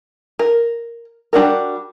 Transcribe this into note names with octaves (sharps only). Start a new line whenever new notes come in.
A#4
G3 D4 F#4 A#4